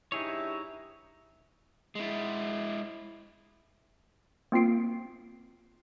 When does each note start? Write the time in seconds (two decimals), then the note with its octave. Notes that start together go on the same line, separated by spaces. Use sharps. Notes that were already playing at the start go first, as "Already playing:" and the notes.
0.12 G2 D#4 E4 G#4 C#5
1.95 G#3 E4
4.52 A#3 C4 F4 C7 D7